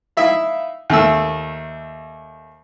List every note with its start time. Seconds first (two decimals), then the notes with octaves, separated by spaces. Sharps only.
0.17 D#4 E4 E5 F5
0.90 D#2 A3 E6